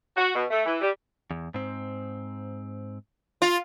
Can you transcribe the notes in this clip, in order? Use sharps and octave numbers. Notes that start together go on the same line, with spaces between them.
F#4
B2
A3
E3
G3
E2
G#2 C4
F4